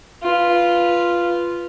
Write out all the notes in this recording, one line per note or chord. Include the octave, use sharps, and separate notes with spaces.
F4 B4